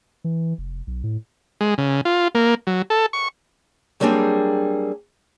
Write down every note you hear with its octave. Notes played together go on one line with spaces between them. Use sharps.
E3
F1
B1
A2
G#3
C#3
F4
A#3
F#3
A4
C#6
F#3 G3 A#3 C4 D4 G#4